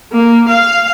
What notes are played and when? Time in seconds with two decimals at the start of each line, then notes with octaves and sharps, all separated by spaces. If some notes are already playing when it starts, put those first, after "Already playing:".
0.13 A#3
0.49 F5